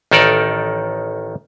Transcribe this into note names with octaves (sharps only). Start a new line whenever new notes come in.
A1 D#3 D#4 A4 A#4 D5